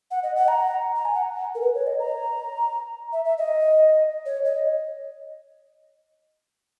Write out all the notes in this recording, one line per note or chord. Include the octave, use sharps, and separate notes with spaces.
F#5
D#5
F#5
A#5
A#5
G#5
F#5
A#4
B4
C#5
D#5
A#5
E5
E5
D#5
C#5
D#5